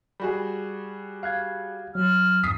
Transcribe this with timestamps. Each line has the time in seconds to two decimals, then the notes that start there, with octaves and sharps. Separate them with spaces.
0.20 G3 F#4 G#4
1.23 F5 F#6 G#6
1.95 F#3 F6
2.43 E2 G2 D#6 B6 C7